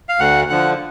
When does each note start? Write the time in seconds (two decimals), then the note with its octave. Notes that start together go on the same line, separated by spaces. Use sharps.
0.09 F5
0.19 D2 F#5
0.50 D3 F3 F#5